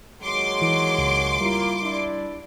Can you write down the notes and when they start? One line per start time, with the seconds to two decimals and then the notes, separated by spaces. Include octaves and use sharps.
0.22 D#2 F#3 G#3 C6 D6
0.62 E3
0.98 C#2
1.41 G3 A#3 E4 F4
1.82 D4 E4 D5